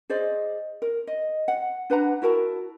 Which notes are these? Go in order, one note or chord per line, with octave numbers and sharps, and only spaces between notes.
G#4 C5 D5 D#5
A#4
D#5
F#5
D4 B4 F#5 A#5
E4 F#4 A#4 A5